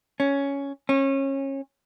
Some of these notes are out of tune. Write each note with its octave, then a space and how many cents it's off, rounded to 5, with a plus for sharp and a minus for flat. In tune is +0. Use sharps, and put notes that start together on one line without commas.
C#4 +10
C#4 -25